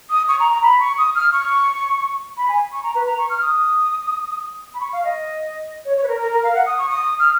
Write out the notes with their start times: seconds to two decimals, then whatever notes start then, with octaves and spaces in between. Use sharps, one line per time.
0.10 D#6
0.28 C#6
0.40 A#5
0.51 A#5
0.63 B5
0.80 C#6
0.98 D#6
1.15 F6
1.33 C#6
2.37 B5
2.48 G#5
2.72 C#6
2.83 A#5
2.95 B4
3.06 A#5
3.18 C#6
3.30 F6
3.41 D#6
4.74 B5
4.80 C#6
4.93 F5
5.04 D#5
5.85 C#5
5.97 C#5
6.04 B4
6.08 A#4
6.21 A#4
6.32 A#4
6.43 F5
6.54 F#5
6.66 D#6
6.78 C#6
6.90 D#6
7.19 F6